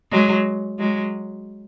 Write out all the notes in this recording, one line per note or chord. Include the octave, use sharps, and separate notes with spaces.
F#3 G#3
F#3 G#3